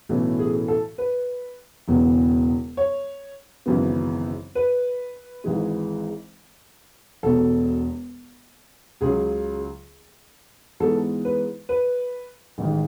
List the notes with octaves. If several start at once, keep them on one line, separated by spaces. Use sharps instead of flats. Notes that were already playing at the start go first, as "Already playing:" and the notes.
B1 A2 E3 A3 C#4
G#4
A4
B4
E1 E2 C#3 E3
C#5
G#1 F#2 C#3 E3 B3
B4
G#1 G#2 E3 G#3
E1 E2 B2 A4
C#2 C#3 F#3 C#4 G#4
G#2 E3 G#3 B3 A4
B4
B4
A1 G#2 D#3 G#3